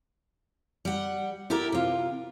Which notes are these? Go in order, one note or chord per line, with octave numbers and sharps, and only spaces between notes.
G3 F#5
E4 G4 A4 A#4
C3 F4